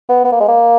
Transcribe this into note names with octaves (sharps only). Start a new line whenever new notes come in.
B3
B3
A#3
G#3
A#3